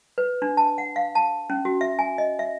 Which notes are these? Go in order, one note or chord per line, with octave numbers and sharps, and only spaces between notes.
B4
D4
A5
F#5
F5
A5
C#4
F#4
E5
G#5
D#5
E5